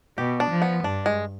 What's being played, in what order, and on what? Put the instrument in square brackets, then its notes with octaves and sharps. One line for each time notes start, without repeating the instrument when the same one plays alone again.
[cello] B2 [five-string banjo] G4
[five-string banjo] D4
[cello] F3
[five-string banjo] B3
[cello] G2 [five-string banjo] D4
[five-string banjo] G#3